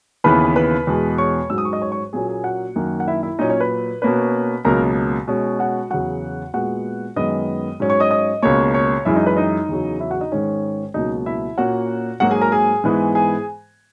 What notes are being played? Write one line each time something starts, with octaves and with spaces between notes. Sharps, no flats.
D#2 C#3 E3 B3 B4 B5
B4 B5
E2 B2 G#3
C#5 C#6
G#2 F#3 C#4 E6
D#6
C#6
D#5 D#6
C#5 C#6
C#5 C#6
A#2 F#3 A#3 C#4 G#4 G#5
G#4 G#5
F#4 F#5
F#2 D#3 F#3 A#3
F#5
E4 E5
E4 E5
A#2 F#3 C#4 D#4 D#5
C#4 C#5
B4
B2 A#3 C#4 B4
C#2 B2 F#3 A#3 A#4 A#5
B2 G#3 C#4
F#4 F#5
E2 C#3 F#3 F#4 F#5
A#2 G#3 B3 F#4 F#5
F#2 D#3 G#3 B3 D#5 D#6
G#2 F#3 C#4
C#5 C#6
D#5 D#6
D#5 D#6
C#2 B2 A#3 C#5 C#6
C#5 C#6
F#2 E3 G#3 E4 E5
D#4 D#5
B4
D#4 D#5
E2 C#3 F#3
E4 E5
F#4 F#5
D#4 D#5
G#2 D#3 G#3 C#4 C#5
C#2 B2 F#3 A#3 D#4 D#5
E4 E5
A#2 A#3 C#4 F#4 F#5
G#2 F#3 A#3 F#4 F#5
G#4 G#5
A#4 A#5
G#4 G#5
G#2 E3 G#3 B3
G#4 G#5